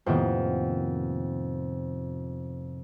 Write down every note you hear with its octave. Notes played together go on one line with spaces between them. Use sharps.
F2 A2 C3 D#3 A#3 B3